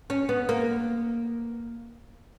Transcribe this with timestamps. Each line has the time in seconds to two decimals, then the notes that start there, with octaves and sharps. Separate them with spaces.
0.10 C#4
0.29 B3
0.49 A#3